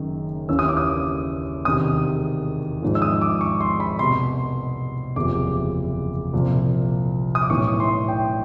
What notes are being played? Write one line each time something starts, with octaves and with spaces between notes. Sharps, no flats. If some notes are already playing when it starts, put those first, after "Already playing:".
Already playing: F#1 F#2 D#3
D#2 C#3 E3 E6
D#6
D6
D#6
E1 E2 C3 D#3 D#6
G#1 G#2 F3
E6
D#6
D6
C#6
C6
B5
C2 B2 C6
F#1 E2 C3 F3 D6
C2 A#2 F3
D#6
D6
B1 A2 E3 C#6
C6
G5